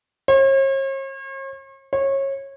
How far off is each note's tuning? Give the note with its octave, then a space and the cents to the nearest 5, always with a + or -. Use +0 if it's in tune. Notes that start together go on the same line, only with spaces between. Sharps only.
C#5 -45
C#5 -25